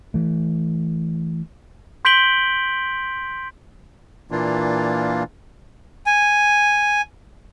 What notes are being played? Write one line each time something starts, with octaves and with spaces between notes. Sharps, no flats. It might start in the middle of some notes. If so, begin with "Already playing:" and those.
E3 A3
C6 G6 B6 D7 F#7 G7
A#2 E3 A#3 D4 F4
G#5